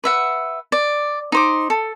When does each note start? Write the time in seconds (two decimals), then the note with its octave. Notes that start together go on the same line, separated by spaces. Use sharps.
0.04 B4 E5 F#5
0.72 D5
1.32 D#4 C5 D6
1.70 A4